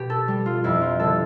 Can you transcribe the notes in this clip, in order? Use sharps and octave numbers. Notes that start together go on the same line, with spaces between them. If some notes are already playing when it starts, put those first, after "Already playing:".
Already playing: B2 G4
A4
G3
F4
F2 E4
F4
D3 G3 A4